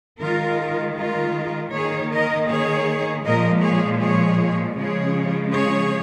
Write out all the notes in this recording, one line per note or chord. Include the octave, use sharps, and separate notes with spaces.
D#3 G#3 F4 A#4
F4 A#4
D#3 A#3 G#4 C#5
A#4 D#5
G#4 C#5
A#2 F3 G#3 A#4 D#5
G#4 C#5
G#4 C#5
C#3 F3 G#3 G#4 C#5
G#4 C#5